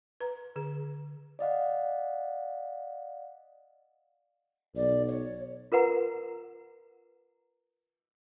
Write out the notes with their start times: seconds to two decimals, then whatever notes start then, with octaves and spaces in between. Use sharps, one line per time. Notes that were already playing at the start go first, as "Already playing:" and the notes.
0.20 B4 A#5
0.56 D3 G#4
1.39 D5 D#5 F5 F#5
4.75 B1 D5
5.07 C#5
5.72 F4 A#4 B4 F#5 A#5